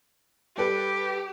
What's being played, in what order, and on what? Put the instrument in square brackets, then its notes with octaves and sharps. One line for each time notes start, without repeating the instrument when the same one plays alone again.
[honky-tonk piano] G3 A4 B4 [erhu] G4